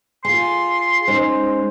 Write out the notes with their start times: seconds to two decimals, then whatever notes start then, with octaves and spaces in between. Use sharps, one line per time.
0.25 F4 G#4 C6
1.08 G#3 C#4 D#4 C5